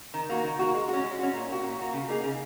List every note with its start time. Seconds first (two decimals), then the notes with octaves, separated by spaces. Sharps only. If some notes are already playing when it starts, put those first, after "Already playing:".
0.14 D#3
0.29 A#3 F#4
0.44 D#3
0.59 A#3 F#4
0.74 G#3
0.88 C#4 F#4
1.04 G#3
1.19 C#4 F#4
1.33 A#2
1.49 A#3 F#4
1.63 A#2
1.79 A#3 F#4
1.93 C#3
2.08 A#3 D#4 G#4
2.24 C#3